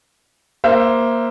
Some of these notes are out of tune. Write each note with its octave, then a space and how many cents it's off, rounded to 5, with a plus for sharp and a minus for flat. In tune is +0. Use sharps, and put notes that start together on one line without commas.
A#3 +10 C5 +0 E5 +20